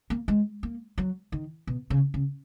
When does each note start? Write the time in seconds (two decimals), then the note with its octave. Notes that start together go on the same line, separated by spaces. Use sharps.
0.10 A#3
0.28 G#3
0.63 A#3
0.98 F#3
1.32 D#3
1.67 B2
1.90 C#3
2.14 C#3